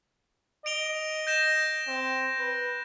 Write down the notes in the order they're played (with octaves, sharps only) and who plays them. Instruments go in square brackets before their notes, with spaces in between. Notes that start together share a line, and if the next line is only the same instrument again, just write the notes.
[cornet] D#5 [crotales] D7 F7 G7
[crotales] G6 A#6 E7
[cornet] C4
B4